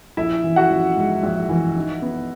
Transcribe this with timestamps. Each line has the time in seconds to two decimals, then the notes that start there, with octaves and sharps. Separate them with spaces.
0.17 A#1 E4 E5
0.44 E3
0.56 F#4 F#5
0.70 A#1
0.97 G#2
1.23 A#1
1.49 E3
1.76 D#4
2.02 B3